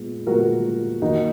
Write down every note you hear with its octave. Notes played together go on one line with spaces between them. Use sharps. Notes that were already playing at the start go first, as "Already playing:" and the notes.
Already playing: A#2 G#3 B3
A#2 G#3 B3 F#4 A#4
D#3 A#3 D#4 F#4